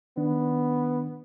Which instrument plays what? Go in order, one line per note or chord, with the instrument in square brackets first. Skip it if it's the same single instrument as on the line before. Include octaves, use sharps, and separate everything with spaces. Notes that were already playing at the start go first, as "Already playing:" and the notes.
[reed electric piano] D#3 D4 [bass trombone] B3